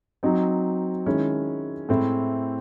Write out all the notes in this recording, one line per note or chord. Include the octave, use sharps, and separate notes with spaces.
F#3 C4 D#4
D#3 G#3 C#4 E4
A2 G#3 C4 E4